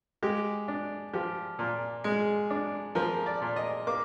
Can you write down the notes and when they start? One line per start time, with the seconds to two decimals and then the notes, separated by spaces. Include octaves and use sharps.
0.22 G#3 G4
0.68 D4
1.13 F3 G4
1.59 A#2
2.04 G#3
2.50 D4
2.95 F3 A#4
3.26 D5
3.42 A#2
3.56 D#5
3.87 A#3 D6